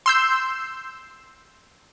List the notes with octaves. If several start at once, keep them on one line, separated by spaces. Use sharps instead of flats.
C6 E6 G6